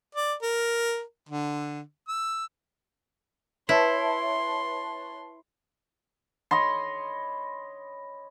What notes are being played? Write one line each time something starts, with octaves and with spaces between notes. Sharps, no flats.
D5
A#4
D3
E6
E4 B4 C#5 A5 C6
C#5 D#5 B5 C6